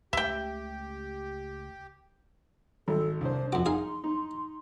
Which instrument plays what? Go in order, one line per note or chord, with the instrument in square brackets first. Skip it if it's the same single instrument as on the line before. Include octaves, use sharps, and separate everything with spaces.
[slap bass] C#2 C#3 A3 [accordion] G4 [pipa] E5 G5
[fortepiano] G#1 [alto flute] A4
[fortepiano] C2 C5 [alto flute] D4
[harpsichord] F2 D6 [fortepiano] F#4 [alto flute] C6
[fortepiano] D#4 [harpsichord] G#4 F5
[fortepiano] D#4